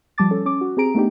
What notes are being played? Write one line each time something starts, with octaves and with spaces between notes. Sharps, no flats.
F3 G3 A5 D6 A6
C#4 A4
C#4 D6
F#4
C4 G4 G#4 A#5 D7
A3 B3 D4 D#4 G4